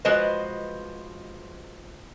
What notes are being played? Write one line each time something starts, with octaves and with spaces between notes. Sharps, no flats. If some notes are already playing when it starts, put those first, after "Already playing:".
F3 G#3 F#4 B4 C5 D#5